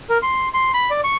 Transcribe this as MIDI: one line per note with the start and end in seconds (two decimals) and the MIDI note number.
0.10 0.18 70
0.22 0.48 84
0.54 0.72 84
0.74 0.90 83
0.90 1.01 74
1.04 1.16 85